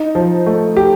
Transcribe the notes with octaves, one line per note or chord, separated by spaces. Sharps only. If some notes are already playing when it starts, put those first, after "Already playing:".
Already playing: D#4
F3
A3
G4